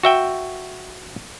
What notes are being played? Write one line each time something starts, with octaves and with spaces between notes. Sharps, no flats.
F#4 E5 G5